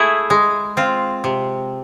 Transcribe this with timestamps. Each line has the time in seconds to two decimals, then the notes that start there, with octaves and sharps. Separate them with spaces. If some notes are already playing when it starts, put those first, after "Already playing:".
Already playing: A3 E4 G#4
0.30 G#3
0.77 C4 F4
1.24 C3